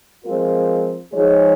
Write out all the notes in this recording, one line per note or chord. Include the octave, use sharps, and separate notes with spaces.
F3 G#3 C4 F4 A#4
F3 G#3 D#4 G#4 C#5